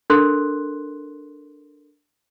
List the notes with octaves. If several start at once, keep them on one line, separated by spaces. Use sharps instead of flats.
D4 A4 A#4 C6 F#6